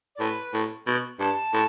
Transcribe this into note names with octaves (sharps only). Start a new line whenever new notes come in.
D5
A2 B4
A2
B2
G2 A5
A2